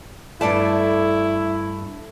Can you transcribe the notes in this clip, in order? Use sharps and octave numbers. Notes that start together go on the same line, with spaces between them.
G2 A3 E4 D5 A5